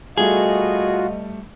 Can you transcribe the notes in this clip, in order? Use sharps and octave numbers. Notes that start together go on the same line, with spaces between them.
B2 G3 A3 F4 F#4 G#4 D#5